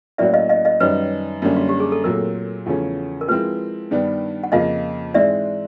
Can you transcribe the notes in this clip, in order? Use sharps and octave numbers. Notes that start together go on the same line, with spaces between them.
A2 F#3 A#3 C#4 F#4 D5 E5
D#5 F5
D#5 F5
D#5 F5
F#2 D#3 G3 B4 C#5
F#2 D3 G3 A#3 C#4
F#4
G4
G#4
A4
A#2 F#3 A3 C4 A#4
E2 C#3 F3 A3 C#4
A#4
F3 G#3 C4 E4 B4
G2 D#3 G3 B3 D4
F#5
F2 C#3 F3 A#3 D#5 F5
G#2 E3 G#3 C4 D5 E5